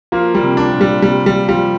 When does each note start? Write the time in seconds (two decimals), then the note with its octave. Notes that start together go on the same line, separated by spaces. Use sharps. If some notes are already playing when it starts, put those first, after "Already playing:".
0.12 F3 A#3
0.35 G3
0.43 C3
0.57 D4
0.72 A#2
0.81 G3
1.02 C3 G3
1.26 G3
1.48 F3 G3